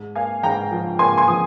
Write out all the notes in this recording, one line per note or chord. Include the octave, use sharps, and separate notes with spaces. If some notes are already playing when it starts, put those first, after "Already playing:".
Already playing: G#2
A#3 F5 G#5
G#2 G5 A#5
F3
A#3 G#5 C6
G#5 C6
F3 D#6